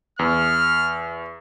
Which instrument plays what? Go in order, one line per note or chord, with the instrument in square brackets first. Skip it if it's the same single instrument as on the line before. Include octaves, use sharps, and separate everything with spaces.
[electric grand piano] E2 [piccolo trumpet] F6